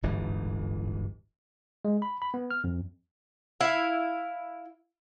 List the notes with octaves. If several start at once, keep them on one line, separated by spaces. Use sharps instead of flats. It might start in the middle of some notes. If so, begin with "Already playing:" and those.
D1 G1 G#2 E3
G#3
B5
B5
B3
F6
F2
E4 F5